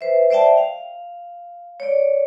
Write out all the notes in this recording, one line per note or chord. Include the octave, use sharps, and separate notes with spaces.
B4 C5 E5
C5 D5 E5 G5 A5
F5
C#5 D5